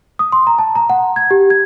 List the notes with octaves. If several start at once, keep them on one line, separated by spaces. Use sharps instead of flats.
D#6
C6
A#5
A5
A#5
F#5
G#6
G4
G#6